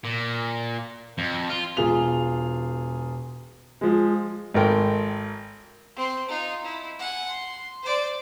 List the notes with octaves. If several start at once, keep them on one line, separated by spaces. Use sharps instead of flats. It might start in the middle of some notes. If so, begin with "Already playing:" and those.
A#2
F2
F4
E1 F4 G#4 F7
F3 G#3
G#1 A3 A#4 G5
C4 C6
D#4 F4
E4
F#5 G#5
C6
C5 D5